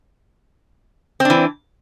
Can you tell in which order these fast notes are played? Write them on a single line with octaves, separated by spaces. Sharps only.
C4 D4 E3